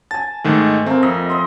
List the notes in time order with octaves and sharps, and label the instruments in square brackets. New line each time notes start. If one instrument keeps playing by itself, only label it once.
[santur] G#5 A5 [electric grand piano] A6
[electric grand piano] G#2 D#3 A3
[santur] A3 A#3 [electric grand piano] C4
[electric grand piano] F2 [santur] D#5
[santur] D#5 C6